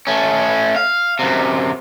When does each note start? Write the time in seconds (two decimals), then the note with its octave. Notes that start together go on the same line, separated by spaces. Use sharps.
0.07 A3 C#4
0.76 F5
1.19 F#2 C3